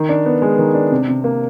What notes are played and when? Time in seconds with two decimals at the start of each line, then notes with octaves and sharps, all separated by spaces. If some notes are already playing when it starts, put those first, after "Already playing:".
Already playing: D#3
0.09 D4
0.26 B3
0.42 G#3
0.59 D#3
0.74 D4
0.91 C3
1.08 C3
1.24 A#3